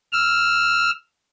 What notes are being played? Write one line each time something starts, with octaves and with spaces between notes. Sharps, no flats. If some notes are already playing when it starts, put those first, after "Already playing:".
E6 F6